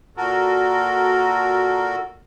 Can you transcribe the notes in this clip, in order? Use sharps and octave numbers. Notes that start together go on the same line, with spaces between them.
A#2 F#4 A4 A#4